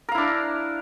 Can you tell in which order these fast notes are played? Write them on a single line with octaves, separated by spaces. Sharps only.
A#4 F5 E4 D4